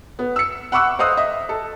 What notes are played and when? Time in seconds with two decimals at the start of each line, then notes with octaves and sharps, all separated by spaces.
0.19 B3
0.36 E6 C#7
0.72 F#5 B5 C#6 D6 E6 F#6
0.99 C5 D#5 F5 D#6 E6 F#6
1.17 D#5 E5
1.49 A4